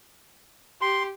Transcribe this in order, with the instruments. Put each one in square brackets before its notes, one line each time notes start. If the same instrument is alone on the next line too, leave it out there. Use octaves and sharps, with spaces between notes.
[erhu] G4 [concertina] C6